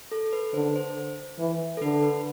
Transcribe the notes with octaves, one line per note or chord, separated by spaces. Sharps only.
A4
B4
D3 C5
C5
E3
A4
D3 B4
B4